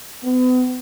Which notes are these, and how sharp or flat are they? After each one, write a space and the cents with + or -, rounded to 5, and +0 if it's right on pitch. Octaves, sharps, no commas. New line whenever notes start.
B3 +40